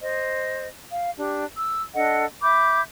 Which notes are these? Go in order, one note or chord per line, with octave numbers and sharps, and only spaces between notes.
C5 D#5
F5
D4 G4
E6
D4 A4 D#5 F#5
E5 B5 D6 G6